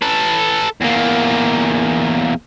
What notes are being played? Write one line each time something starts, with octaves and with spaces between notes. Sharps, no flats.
A4 B4
E2 A#3